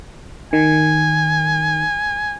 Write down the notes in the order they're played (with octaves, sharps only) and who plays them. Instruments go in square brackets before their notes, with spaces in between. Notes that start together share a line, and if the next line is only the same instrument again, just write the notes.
[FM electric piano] D#3 [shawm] G#5